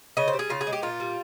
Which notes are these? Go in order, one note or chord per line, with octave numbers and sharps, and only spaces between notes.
C#3 D#5
C5
G3
G#4
C#3 F4
G#4
G#3
G4
A#2 F4
G3